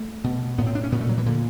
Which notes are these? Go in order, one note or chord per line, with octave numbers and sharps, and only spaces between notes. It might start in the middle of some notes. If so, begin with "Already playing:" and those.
Already playing: A3
B2
A2 B3
C4
D4
C#4
A#2 B3
A3
F#3
E3
A#2 D3